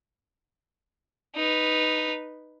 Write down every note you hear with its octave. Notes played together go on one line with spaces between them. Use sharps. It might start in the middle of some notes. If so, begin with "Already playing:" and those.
D#4 B4